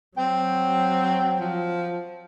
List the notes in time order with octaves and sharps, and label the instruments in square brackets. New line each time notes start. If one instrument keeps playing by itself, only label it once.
[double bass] F#3 [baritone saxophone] C4 [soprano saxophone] G5
[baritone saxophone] F3